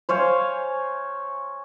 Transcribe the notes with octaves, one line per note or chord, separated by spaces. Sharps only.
C5 C#5 F5 G#5